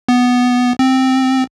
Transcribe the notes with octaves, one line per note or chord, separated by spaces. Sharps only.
B3
C4